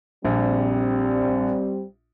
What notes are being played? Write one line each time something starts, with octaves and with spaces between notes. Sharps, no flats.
A#1 G3 C4